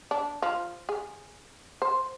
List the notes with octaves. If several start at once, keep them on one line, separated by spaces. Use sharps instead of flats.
D4
F3
G#4
C5